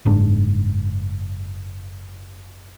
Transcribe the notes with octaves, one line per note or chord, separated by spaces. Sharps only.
F#1 G#2 D4